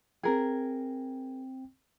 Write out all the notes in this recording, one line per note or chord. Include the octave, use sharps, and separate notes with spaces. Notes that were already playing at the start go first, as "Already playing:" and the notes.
C4 G#4 A#4 G5